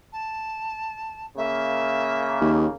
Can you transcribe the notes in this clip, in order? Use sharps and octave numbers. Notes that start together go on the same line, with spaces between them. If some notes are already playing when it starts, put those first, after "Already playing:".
A5
C#3 A#3 E5
D#2